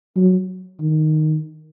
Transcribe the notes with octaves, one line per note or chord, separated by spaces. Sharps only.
F#3
D#3